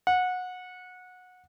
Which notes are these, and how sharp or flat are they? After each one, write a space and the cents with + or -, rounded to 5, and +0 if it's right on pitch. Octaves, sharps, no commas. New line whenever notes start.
F#5 -20